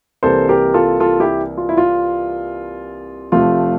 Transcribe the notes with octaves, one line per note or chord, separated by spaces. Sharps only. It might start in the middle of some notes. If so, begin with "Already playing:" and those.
C2 C3 E3 A#3 A4 C5
G4 A#4
F4 A4
F4 A4
E4 G4
F4
E4
F4
F1 F2 C3 F3 A3 F4